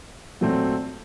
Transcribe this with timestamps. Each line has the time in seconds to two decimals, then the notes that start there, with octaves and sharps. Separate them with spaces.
0.41 A#2 F#3 A3 C4